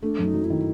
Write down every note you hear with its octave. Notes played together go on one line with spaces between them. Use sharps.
A3 D4
F#2
D#4
F#3
E4
D#3